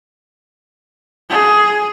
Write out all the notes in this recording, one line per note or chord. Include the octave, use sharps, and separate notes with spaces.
G#4